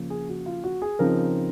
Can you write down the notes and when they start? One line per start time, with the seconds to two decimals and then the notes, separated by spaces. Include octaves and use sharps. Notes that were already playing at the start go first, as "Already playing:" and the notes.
Already playing: C#3 F3 A#3
0.10 G#4
0.29 F#4
0.46 F4
0.64 F#4
0.82 G#4
0.99 C#3 F3 C4 D#4 A#4